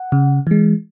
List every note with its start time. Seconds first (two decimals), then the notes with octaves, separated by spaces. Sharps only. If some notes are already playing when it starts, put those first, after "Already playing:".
Already playing: F#5
0.12 C#3
0.47 E3 G#3